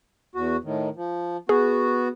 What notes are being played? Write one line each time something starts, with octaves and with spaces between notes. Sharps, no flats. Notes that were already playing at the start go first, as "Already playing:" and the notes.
E2 F#4
A2 D#3
F3
B3 F#4 G#4